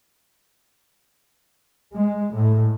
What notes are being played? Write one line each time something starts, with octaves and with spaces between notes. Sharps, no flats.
G#3
A2